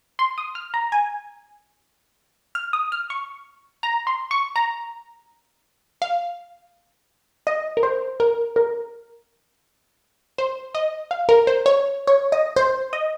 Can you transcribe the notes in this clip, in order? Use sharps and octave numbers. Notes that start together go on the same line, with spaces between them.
C6
D#6
F6
A#5
G#5
F6
D#6
F6
C#6
A#5
C6
C#6
A#5
F5
D#5
A#4
C5
A#4
A#4
C5
D#5
F5
A#4
C5
C#5
C#5
D#5
C5
D#5